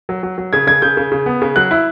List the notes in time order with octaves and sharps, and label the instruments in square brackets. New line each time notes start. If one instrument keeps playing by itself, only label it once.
[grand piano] F#3
F#3
F#3
C#3 G#6
C#3 G#6
C#3 G6
C#3
C#3
B3
C#3
F#3 F#6
E4